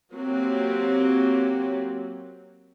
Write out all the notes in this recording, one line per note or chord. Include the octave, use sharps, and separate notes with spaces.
F#3 A#3 C4 G4